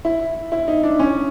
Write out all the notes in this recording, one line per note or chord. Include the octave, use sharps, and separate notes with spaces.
E4
E4
D#4
D4
C#4